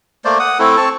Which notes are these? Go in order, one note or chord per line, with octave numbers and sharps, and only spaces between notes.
A3 A#3 C5 D5
F#5 D#6
A3 C4 E4 A4
C4 A5 C#6